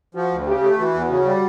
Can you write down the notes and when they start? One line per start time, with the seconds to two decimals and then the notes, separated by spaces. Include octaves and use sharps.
0.15 F3 F#4
0.31 D2
0.47 C#3 G4
0.62 A3
0.78 E3 F#4
0.94 E2
1.09 C#3 F#4
1.25 G3